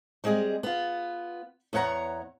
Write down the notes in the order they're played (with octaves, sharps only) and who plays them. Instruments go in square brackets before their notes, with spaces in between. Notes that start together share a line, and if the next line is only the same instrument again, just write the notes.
[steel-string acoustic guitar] G3 G#3 C4 G#4 D#5
B3 F4
E2 B3 C#5 F#5 A#5